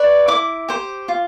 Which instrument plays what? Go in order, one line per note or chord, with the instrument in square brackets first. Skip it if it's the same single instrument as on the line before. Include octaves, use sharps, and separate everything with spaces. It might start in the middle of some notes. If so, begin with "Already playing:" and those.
Already playing: [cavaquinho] B4 D5 C#6
E4 D6
G4 C5
F4